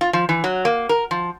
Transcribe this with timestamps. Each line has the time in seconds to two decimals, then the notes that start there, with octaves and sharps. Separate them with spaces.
0.01 F4
0.13 F3
0.29 E3
0.44 F#3
0.65 A#3
0.89 A#4
1.11 F3